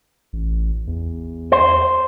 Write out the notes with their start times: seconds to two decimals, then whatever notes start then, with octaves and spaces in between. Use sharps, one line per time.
0.33 A1
0.87 E2
1.52 C5